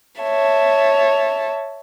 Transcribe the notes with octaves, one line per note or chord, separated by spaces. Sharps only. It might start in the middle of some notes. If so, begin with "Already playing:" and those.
C#5 E5 A5